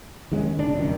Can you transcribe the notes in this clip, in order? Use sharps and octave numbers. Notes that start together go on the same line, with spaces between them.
D#3 G#3 B3 C#4
D#1 C#3 D4
F1 C#2 F#2 D#3